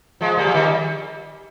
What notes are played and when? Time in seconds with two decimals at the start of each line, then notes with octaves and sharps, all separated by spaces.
0.21 F3 G#3
0.38 G3 A#3
0.47 F3
0.54 D#3 G3